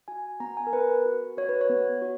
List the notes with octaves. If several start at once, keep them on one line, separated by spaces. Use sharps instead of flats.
F#4 G#5
B3 A#5
G#5
A#4
B3 B4
F#4
F#4 C#5
B4
C#5
B3
F#4